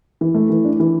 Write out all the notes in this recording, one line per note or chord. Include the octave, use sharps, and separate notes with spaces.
E3
A3
E3
D4
E3